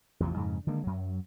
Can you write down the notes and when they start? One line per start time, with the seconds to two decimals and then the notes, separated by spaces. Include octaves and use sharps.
0.20 A1 E2 C3 F3
0.36 F2 G#2 C#3
0.67 D3 D#3 G#3 A#3
0.84 F#2 F#3